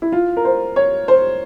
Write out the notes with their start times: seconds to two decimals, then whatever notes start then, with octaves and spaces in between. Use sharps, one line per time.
0.02 E4
0.12 F4
0.37 A#4
0.45 C5
0.76 C#5
1.08 C5